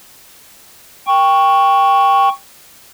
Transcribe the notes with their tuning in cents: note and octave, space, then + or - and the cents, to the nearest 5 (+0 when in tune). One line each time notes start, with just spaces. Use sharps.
G5 +10 C#6 +0